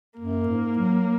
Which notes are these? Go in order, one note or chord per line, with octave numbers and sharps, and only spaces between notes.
F#2 A#3
G#2
F#3